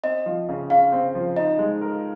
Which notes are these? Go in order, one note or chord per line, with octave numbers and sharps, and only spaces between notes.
C4 D#5
F3
C#3
C#3 F5
C4
F3
D#4 D#5
G#3
A#4